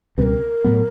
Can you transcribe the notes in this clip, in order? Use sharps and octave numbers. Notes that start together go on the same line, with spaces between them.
C#2 B2 G3 C4 A#4 B4
A2 F#3 B3